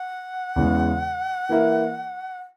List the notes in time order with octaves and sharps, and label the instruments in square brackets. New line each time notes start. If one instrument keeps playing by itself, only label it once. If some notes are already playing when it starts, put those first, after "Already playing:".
Already playing: [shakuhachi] F#5
[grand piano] E2 C#3 E3 G#3
E3 A#3 E4 A#4 E5